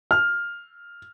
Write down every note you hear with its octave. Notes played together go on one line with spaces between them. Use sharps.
F6